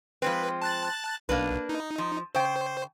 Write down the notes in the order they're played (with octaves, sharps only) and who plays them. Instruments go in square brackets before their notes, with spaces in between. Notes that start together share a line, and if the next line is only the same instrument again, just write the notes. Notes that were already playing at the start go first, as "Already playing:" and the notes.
[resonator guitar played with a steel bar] F3 G#3 C4 [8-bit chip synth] B4
[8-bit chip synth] A5 F#6 A6
[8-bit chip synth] B1 [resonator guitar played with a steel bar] A#3 D4 B4
[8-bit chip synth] D#4
[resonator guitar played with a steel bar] F3
[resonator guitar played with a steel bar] C#3 G5 [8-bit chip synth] C5